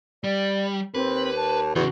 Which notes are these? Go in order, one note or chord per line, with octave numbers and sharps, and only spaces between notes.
G3 D5
D#2 C4 B4
A5
E2 C#3 E3 F#4